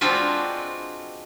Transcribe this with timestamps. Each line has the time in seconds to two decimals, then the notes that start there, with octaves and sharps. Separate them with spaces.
0.01 G#3 C4 D4 F4 F#4 B4